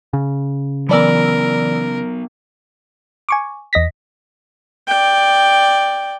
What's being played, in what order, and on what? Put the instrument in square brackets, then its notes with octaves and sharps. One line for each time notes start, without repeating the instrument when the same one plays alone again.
[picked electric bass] C#3
[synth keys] E3 D5 E6 [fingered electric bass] F#3 B3 [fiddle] A#4
[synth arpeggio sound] G#5 C#6 D6
E2 D#5 A#6 B6
[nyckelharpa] D5 G5